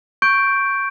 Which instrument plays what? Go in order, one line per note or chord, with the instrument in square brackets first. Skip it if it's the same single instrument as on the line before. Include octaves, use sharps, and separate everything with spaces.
[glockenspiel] C#6 G6 D7